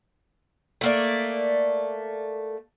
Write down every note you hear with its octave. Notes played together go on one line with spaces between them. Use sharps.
A3 A#3 D5